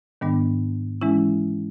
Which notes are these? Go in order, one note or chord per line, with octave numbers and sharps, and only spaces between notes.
G#2 D#3 G3 B3 D4
E3 G#3 C#4 E4